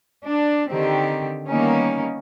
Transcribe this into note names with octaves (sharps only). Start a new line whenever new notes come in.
D4
D3 D#3 C4 G4
D#3 G3 A#3 B3 C#4 D#4